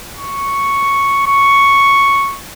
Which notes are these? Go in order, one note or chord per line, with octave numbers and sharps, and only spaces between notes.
C#6
C#6